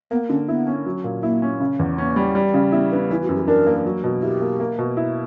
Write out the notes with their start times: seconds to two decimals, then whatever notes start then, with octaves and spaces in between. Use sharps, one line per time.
0.11 A#3 B3
0.29 D3 C#4
0.48 B3 E4
0.67 C#4
0.86 F#3
1.04 A#2
1.23 A#3 E4
1.42 C#4
1.60 C#3
1.79 E2
1.98 A#3 C#4
2.16 G3
2.35 G3
2.54 C#3
2.72 B3 E4
2.91 B3 D4
3.10 E3 E4
3.23 F#4
3.29 F#2
3.36 G4
3.47 D4 A#4
3.66 A#3
3.85 F#3
4.04 B2
4.22 E4 G4
4.41 A#3
4.60 A#3
4.79 B2
4.97 E4